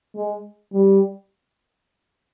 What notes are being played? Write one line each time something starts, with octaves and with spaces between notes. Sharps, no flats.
G#3
G3